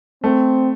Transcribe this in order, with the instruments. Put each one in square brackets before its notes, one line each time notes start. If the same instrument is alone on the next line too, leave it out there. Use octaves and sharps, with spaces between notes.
[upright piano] A3 [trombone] C4